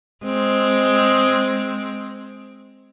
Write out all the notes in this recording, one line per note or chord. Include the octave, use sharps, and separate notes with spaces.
G#3 C4